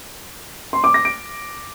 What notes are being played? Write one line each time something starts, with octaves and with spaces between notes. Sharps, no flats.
C6
D6
A#6
D7